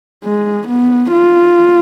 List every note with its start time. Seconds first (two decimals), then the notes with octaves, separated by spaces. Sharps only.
0.24 G#3
0.68 B3
1.12 F4